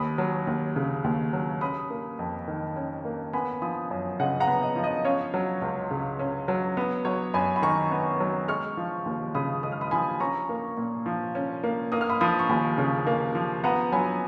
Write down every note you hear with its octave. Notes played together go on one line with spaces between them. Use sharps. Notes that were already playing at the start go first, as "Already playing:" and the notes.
Already playing: D#2 B5 D#6
F#3
D#2
C#3
D#2
F#3
C#4 B5 D#6
A#3
F2
D#3
C#4
A#3
B3 G#5 B5
F3 B5 D#6
F#2
C#3 D#5 F#5
F#5 A#5
B3
D#5
F3
D#5
C#4 C#5 F5
F#3
C#2
C#3
C#4
F#3
B3
F#3 C#5
F#2 G#5 B5
B5
D#3 A#5 C#6
B3
F#3
G#3 C#6 F6
F3
D#2
C#3 B5 D#6
G#3 D#6
F6
B5 D#6
F3 G#5 B5
C#4 A#5 C#6
A#3
A#2
F3
C#4
A#3
A#3 D#6
F6
B5 D#6
F3 B5 D#6
C#6
D#2 G#5 B5
C#3
A#3
F3
B3 F#5 A#5
F#3 G#5 B5